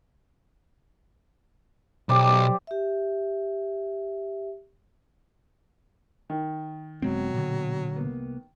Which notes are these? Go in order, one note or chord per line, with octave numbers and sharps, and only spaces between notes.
B1 G4 C5 D5
G4 E5
D#3
E1 B2 F#3 G#3 C4
A#2 D3
C2 A#3 B3